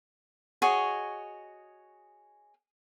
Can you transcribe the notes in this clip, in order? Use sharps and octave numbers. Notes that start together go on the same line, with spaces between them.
F#4 G#4 C#5 D#5